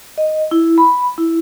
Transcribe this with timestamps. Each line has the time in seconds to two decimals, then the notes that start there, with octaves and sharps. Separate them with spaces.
0.18 D#5
0.51 E4
0.78 B5
1.18 E4